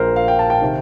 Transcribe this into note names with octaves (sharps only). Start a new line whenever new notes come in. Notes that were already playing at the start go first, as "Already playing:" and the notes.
Already playing: A#1 A#2 A#4 C5
F5
G5
A5
G5
C3 D#3